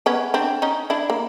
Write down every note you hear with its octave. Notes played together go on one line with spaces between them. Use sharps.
B3 C#4
C4 D4
C#4 D#4
D4 E4
A#3